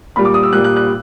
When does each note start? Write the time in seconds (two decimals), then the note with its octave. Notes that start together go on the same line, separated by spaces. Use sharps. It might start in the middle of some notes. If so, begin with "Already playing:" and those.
0.16 A#2 G3 B5
0.25 D6
0.34 D#6
0.43 E6
0.53 A#2 G3 F#6
0.64 F#6
0.76 F#6